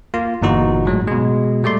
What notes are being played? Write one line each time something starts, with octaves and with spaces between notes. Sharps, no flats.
A#3 F4
G1 A#2 E3 D#4 F#4
A2 F#3 G#3
B2 G#3
A#2 G3 A3 D5 C6